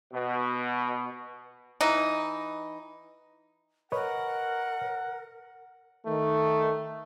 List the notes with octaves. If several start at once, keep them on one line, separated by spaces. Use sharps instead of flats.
B2
E3 D#4
A#4 B4 C#5 D#5 F#5
D#3 A3